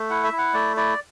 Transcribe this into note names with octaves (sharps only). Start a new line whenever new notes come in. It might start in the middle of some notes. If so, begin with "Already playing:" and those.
Already playing: A3
E4 F#5
E5
E4
F#5
A3 D5
E4 D5